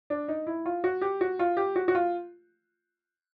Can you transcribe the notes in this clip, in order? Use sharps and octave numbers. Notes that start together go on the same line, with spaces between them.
D4
D#4
E4
F4
F#4
G4
F#4
F4
G4
F#4
F#4
F4